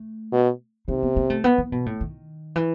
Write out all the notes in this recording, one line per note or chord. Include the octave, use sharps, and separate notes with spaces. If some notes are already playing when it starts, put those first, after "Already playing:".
Already playing: A3
B2
C3 D#4
B3
B3
A3
B3
E3
B2
A2
D#3
E3